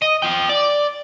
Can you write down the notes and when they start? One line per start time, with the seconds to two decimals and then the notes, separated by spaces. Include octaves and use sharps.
0.02 D#5
0.22 F4 G5
0.49 D5